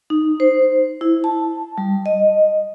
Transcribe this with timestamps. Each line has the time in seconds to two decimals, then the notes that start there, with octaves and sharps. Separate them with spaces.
0.10 D#4
0.40 C5
1.01 E4
1.24 A5
1.78 G3
2.06 D#5